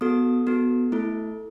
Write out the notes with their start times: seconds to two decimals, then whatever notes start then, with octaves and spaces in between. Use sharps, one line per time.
0.01 B3 F#4 A4 D#6
0.47 B3 F#4 A4
0.92 A3 E4 A4